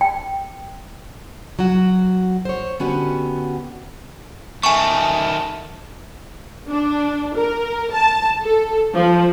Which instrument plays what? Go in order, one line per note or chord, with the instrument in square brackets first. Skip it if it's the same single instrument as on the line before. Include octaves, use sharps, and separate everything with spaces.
[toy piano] G5
[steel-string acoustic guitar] F#3 F#4
C5 C#5
D3 B3 C#4 F#4 G4
[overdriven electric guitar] D#3 A3 [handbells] G#5 C#6
[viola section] D4
A#4
A5
A4
F3